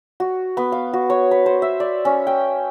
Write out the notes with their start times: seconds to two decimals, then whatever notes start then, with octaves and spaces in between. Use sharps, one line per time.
0.20 F#4
0.57 B3
0.72 F5
0.93 F#4
1.10 C#5
1.31 B4
1.46 C5
1.62 E5
1.80 D5
2.05 C#4
2.27 G5